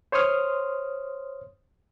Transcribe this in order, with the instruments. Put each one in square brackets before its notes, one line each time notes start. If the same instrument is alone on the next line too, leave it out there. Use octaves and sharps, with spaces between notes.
[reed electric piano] C5 C#5 C6 D#6 F6